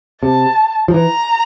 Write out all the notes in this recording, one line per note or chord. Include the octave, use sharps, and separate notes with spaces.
C3 A5
F3
E3 A#5